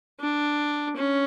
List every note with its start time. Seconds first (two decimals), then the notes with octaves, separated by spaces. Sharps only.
0.20 D4
0.96 C#4